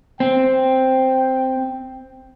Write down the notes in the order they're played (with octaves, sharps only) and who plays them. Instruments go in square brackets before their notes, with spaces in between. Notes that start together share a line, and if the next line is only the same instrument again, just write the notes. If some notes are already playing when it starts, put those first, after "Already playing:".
[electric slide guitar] C4 [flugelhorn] G5